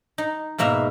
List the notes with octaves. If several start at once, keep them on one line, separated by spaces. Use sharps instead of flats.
D#4
G#2 B2 A#3 E5 A#5